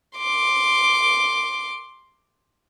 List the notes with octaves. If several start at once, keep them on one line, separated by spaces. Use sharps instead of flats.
C6 D6